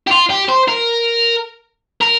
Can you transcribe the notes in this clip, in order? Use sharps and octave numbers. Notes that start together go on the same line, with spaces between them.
G4
F4
G4
C5
A#4
A#4